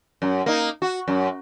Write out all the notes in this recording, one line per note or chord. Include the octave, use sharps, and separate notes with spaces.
F#2
A#3 D#4
F#4
F#2